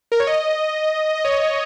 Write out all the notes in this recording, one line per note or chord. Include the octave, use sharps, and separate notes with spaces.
A#4
C#5
D#5
D#5
C#5
D#5